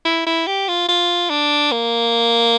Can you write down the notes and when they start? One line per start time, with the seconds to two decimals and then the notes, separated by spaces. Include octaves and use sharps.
0.05 E4
0.26 E4
0.47 G4
0.68 F4
0.88 F4
1.30 D4
1.72 A#3